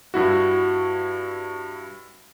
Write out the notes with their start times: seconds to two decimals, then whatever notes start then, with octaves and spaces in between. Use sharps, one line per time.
0.14 G2 E4 F#4